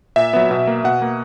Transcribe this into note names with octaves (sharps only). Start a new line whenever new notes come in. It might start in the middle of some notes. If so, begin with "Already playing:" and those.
A#2 E5
F#3 B3
B2
A#3
B2 F#5
A#3